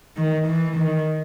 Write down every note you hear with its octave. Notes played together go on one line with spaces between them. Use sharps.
D#3
E3
D#3